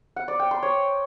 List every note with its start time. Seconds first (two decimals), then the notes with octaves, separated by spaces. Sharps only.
0.16 F#5
0.28 D5
0.40 G5
0.51 C6
0.63 C#5